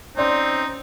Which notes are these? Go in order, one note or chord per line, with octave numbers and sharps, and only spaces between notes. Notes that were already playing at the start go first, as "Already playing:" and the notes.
C4 C#4 D#4 D5 C6